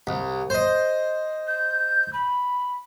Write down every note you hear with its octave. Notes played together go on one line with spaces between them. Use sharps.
C2
C5 D#5
G6
B5